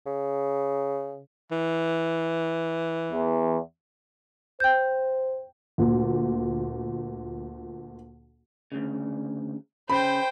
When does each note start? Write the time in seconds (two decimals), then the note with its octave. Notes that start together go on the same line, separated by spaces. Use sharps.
0.06 C#3
1.51 E3
3.12 E2
4.60 C5 G5 G6
5.78 D2 A#2
8.72 D2 C#3
9.90 C#3 C5 G5 B5